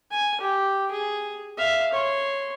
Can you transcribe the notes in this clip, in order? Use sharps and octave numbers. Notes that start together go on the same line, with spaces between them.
G#5
G4
G#4
E5 F5
C#5 C6